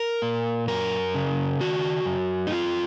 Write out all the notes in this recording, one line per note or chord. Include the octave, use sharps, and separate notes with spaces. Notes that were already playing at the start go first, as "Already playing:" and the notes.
Already playing: A#4
A#2
F#2 A#4
C#3
D#3 F#4
F#2
D#4
C4 F4